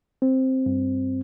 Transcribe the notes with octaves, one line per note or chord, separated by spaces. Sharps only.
C4
G2